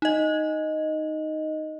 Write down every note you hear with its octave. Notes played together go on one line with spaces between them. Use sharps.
D#4 D#5